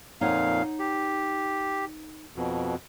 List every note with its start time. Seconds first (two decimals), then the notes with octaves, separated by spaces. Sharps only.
0.21 F2 A#2 D#4 C#5 F5 F#5
0.80 G4
2.36 F2 B2